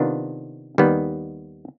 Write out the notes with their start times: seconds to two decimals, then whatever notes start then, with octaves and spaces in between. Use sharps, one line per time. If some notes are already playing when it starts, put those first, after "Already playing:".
Already playing: C3 D#3 B3 D4 F4
0.78 D#2 D#3 G3 B3